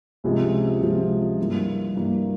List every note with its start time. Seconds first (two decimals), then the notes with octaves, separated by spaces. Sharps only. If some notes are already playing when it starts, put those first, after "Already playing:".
0.24 C#2 C3 F3 G#3
0.81 C#2 C3 F3 G#3
1.39 G2 E3 A#3
1.95 G2 E3 A#3